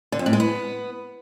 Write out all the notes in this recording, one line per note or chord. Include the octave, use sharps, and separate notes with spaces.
D3
F2
A2
G#3
B3